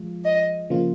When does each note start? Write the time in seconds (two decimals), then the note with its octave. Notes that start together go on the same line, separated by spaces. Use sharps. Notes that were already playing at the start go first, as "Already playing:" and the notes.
Already playing: F3 G#3 F4
0.24 D#5
0.70 C#3 F3 A#3 F4